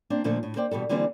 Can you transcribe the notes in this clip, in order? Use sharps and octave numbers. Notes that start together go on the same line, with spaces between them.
A#3 C4 D4
A#2 D3 F3 A3
A2
A#3 C5 D5 G5
B2 E3 G3 A4
D3 E3 G3 A#3 C4 D4